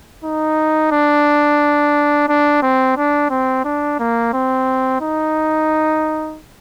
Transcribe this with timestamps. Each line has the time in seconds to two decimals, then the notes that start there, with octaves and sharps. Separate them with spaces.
0.24 D#4
0.92 D4
2.28 D4
2.62 C4
2.97 D4
3.30 C4
3.65 D4
3.99 A#3
4.33 C4
5.01 D#4